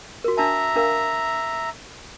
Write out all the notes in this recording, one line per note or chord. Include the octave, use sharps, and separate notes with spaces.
F#4 A#4
D4 E5 A5 A#5
D4 A#4 F5